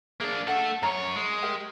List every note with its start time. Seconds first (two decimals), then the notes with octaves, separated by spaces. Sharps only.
0.21 A#3 D4 G#4 F5
0.48 A3 D4 A4 F#5
0.83 F#2 C#5 A#5
1.16 G#3
1.43 G4 A#4 G5